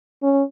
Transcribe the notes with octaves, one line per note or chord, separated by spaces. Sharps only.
C#4